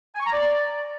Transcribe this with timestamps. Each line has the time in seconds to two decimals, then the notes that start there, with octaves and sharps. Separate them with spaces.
0.14 G#5
0.20 C#6
0.26 A#5
0.33 D5